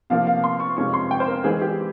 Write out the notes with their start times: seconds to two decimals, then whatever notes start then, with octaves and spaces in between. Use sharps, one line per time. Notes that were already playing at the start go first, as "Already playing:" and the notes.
0.10 C3 F3 A#3 F4 F5
0.27 F5
0.44 C6
0.60 C#6
0.77 F2 C3 F3 G#3 C#4 C#6
0.94 C6
1.11 G5
1.20 C5
1.27 A#4
1.44 E3 G#3 C4 G#4
1.62 G4